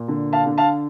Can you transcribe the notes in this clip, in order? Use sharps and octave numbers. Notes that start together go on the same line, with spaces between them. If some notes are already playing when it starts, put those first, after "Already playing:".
Already playing: A#2
D3
F5 A5
D3
F5 A5